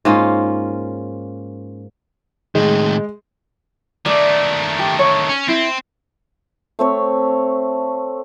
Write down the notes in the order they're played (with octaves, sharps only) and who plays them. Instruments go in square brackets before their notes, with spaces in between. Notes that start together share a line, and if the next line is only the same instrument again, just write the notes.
[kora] G#2 A#3 C#4 F4
[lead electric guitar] A2 D#3 [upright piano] G#3
[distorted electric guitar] D#3 A3 [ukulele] D5
[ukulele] G4
C#5
[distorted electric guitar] C#4
[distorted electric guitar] C4 [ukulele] E4
[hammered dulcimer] A3 C4 C#5